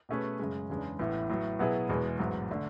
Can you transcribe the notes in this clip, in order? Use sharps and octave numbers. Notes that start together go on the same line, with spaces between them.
B2 A3 C#4 G#4 B4
F#2 C#3 G#3
E2 C#3 G#3 D4
A1 A2 E3 B3 E4
A2 F#3 B3
B2 F#3 B3 E4 G#4
E2 B2 G#3 B3 E4
A1 G#2 F#3 B3
D3 A3